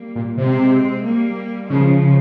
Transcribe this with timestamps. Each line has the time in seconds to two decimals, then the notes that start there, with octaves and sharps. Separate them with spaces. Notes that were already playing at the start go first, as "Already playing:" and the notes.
Already playing: G3 A#3
0.15 A#2
0.37 C3 G#3 C4
1.04 G3 A#3
1.70 C#3 F3 G#3